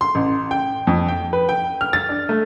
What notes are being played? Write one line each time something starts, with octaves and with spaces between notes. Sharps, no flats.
C6
A1
G5
F2
G5
B4
G5
F6
A6
D4
A3